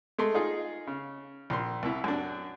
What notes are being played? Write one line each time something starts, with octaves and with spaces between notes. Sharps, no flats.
G#3 A3 C6
D#4 F4 G#4
C#3
A#1 C6
C2 E4
F#2 D4